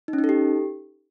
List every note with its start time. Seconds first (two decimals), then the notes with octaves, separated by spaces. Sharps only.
0.08 D#4
0.13 C#4
0.19 D#4
0.24 A4
0.29 G4